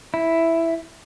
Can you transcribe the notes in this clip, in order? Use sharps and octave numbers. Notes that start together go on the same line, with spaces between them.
E4